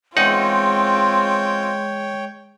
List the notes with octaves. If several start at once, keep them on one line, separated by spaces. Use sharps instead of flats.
E2 G#3 C4 D#4 F4 C#5 F#5 G5